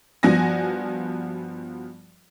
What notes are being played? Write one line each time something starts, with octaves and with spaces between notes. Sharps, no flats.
G2 F3 B3 F#4 G#5 A#6